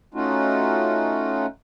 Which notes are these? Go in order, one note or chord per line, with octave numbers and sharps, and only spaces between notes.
A3 C#4 D#4 F4 F#4